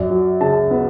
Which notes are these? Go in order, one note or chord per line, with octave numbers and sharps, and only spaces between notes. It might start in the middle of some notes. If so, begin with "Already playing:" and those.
Already playing: F#2 D5
F#3
C#3 A5
B3